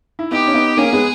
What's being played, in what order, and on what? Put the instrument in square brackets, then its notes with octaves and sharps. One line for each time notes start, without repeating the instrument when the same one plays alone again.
[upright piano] E4
[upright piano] B3 D#4 [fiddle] G4
[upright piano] C#4
B3 D#4
[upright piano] A#3 C#4 [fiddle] G#4
[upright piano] G#3 B3